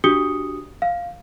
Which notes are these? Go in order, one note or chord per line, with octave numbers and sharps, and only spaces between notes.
D4 F#4 G4 D#6 C#7 G7
F5